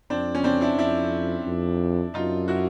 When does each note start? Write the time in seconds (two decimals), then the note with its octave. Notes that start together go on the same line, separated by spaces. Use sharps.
0.10 F2 C4 D4
0.35 C#4
0.44 C4 D4
0.61 D4 E4
0.78 F2 D4 E4
1.46 F2
2.14 F#2 D#4 F4
2.48 E4 F#4